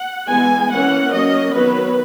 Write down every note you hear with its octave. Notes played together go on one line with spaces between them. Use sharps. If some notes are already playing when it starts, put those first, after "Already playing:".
Already playing: F#5
E3 G#3 B3 G#5
E3 A#3 C#4 F#5
F#3 A#3 C#4 D#5
D#3 F#3 B3 B4